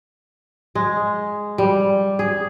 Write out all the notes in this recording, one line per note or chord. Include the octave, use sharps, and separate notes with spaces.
G#3
G3
G#4